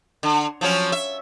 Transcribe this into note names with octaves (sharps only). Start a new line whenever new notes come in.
D3
F3 F#3 C#4
E5